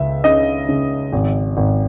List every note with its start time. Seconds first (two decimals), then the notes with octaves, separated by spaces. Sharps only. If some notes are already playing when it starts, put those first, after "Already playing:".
Already playing: C#2 E5
0.24 C#3 D#5
0.69 C#3
1.13 G#1
1.57 G#1